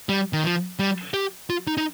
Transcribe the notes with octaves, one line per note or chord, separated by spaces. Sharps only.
G3
D#3
F3
G3
G4
F4
D#4
D#4